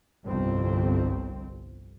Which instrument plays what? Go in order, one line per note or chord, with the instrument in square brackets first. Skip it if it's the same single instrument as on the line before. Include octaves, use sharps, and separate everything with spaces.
[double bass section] G1 C2 F2 C4